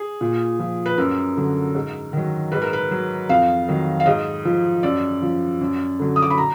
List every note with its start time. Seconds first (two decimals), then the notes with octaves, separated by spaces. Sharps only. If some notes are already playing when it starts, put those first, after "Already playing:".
Already playing: G#4
0.21 A#2
0.59 F3
0.86 B4
0.98 F#2 A#4
1.37 D3 F#3
1.75 G#2
2.13 D#3 F#3
2.52 G#2 B4
2.62 A#4
2.73 B4
2.91 F#3
3.29 F2 F5
3.68 D#3 F#3
4.00 F5
4.06 G#2 D#5
4.45 F3
4.83 F#2 D5
5.22 F3
5.61 F#2
5.99 D3 F#3
6.16 D#6
6.22 D6
6.30 B5
6.38 A#5